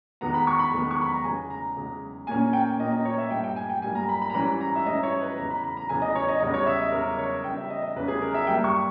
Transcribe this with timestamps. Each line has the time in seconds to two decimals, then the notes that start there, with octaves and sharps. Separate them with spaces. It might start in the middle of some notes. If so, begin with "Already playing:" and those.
0.21 E2 D#3 G#3 B3 A#5
0.34 B5
0.47 C#6
0.59 B5
0.73 E2 D#3 G#3 B3
0.91 C#6
1.01 B5
1.13 A#5
1.24 E2 C#3 G#3 G#5
1.50 A#5
1.76 E2 C#3 G#3
2.27 A#2 A#3 C#4 G#5
2.53 G5
2.79 A#2 A#3 C#4 D#5
2.92 D#5
3.05 C#5
3.18 E5
3.31 G2 G3 A#3 G5
3.44 G5
3.56 G#5
3.70 G5
3.82 G2 G3 A#3 G#5
3.95 A#5
4.09 B5
4.22 B5
4.30 A#5
4.34 G#2 E3 G3 C#4 B5
4.61 A#5
4.75 E5
4.86 G#2 E3 G3 C#4 D#5
5.03 C#5
5.21 B4
5.38 E2 C#3 E3 A#5
5.50 B5
5.63 B5
5.77 A#5
5.89 E2 C#3 E3 G#5
6.02 D#5
6.15 C#5
6.28 D#5
6.40 E2 C#3 G3 D#5
6.54 C#5
6.66 E5
6.80 D#5
6.92 E2 C#3 G3 A#4
7.19 C#5
7.44 E2 C#3 G3 C#4 G5
7.57 E5
7.70 D#5
7.82 D#5
7.95 E2 C#3 G3 C#4 B4
8.08 G#4
8.22 A#4
8.34 E5
8.47 G2 G3 A#3 G5
8.64 C#6